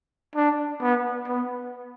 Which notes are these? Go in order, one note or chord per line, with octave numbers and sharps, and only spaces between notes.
D4
B3
B3